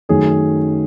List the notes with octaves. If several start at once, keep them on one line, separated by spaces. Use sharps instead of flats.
F#2 D#3 F#3 A3 C#4 G#4